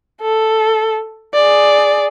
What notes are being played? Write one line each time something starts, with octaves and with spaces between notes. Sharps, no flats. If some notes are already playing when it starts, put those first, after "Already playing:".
A4
G#4 D5